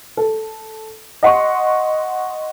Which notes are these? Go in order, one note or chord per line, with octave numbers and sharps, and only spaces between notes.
A4
D#5 F#5 C6 C#6